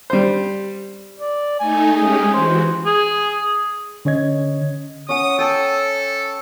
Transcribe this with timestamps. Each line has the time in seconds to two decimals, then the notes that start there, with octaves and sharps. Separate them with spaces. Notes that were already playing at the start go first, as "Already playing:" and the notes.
0.10 G3 C5
1.20 D5
1.59 A3 D#4 G#5
1.96 G#3 C#4 G4 G#4
2.34 E3 F#4 C5
2.86 G#4
4.05 D3 C#4 C#5 D#5 G#6
5.09 C#4 F#5 D#6
5.39 A4 G5 A5